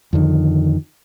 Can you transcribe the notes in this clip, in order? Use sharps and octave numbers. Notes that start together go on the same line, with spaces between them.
F2 D3 D#3